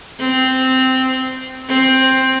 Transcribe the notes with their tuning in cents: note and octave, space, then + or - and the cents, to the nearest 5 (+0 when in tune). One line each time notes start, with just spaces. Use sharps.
C4 -10
C4 +10